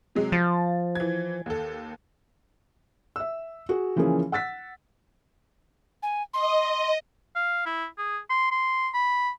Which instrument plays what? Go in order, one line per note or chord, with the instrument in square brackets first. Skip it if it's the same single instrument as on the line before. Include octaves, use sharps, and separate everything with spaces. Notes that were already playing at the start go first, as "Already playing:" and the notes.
[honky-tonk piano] C3 F#3 G#3
[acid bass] F3 [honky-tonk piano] A6
[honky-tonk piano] E3 G#6
D#2 A4
[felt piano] E5 E6
F#4 G#4
C#3 E3 F3 A#3 C#4 G#4
F#5 E6 A6 B6
[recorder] G#5
[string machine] D#5 [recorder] C6
[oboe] F5
E4
G#4
C6
C6
B5